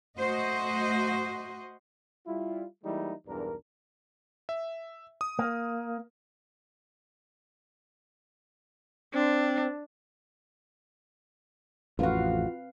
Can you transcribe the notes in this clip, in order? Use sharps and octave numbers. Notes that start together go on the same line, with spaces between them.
A3 F#4 C5 D#5
G3 E4 F4
E3 G3 G#3 A#3 D#4 E4
B1 E2 G2 D4 A#4
E5
D#6
A#3
C4 D4
A1 F2 C4 F4 F#4 B4 F5